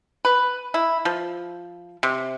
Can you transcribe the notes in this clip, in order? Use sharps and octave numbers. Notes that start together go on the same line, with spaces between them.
B4
E4
F3
C3